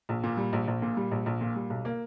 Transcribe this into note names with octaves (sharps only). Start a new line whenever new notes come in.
A#1
A#2
G3
A#1
A#1
A#2
G3
A#1
A#1
A#2
G3
B1
A#3